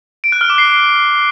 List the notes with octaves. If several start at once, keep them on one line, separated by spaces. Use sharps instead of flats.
D7
F#6
F6
D6
C7